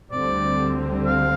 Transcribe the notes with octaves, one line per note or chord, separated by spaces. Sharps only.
D2 D3 G3 C4 D5
F5